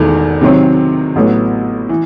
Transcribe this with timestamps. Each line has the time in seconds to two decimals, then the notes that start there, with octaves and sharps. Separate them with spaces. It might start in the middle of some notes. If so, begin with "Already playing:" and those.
Already playing: E1 E2 D#3 A3
0.41 C3 D#3 F#3 C4
1.16 A1 A2 F#3 B3
1.89 E3